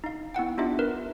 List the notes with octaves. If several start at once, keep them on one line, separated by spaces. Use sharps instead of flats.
D#4 F5
B3 E4 F#5 G5
B3 D4 D#4 F4 G4 E5
A#4 B4